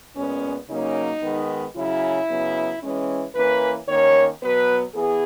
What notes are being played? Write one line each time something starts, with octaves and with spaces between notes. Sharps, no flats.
A#2 G#3 B3 C#4
C#3 F#3 A#3 C#4 D#4
D#3 G#3 B3
C#3 F#3 C#4 E4
C#3 F#3 B3
E3 G#3 C#4
E3 A#3 C#4 B4
D#3 A#3 C#4 C#5
B2 F#3 B3 B4
E3 B3 G#4